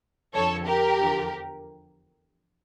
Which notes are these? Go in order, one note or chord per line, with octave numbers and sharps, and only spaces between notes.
F2 D3 F3 A4 C#5
G4 A#4
E2 D3 F3